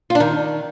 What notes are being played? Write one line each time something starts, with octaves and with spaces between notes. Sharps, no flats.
F4
D4
D#3